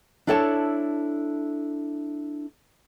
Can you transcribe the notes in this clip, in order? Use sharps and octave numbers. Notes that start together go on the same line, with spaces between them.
D4 E4 A4 C#5 F#5 A5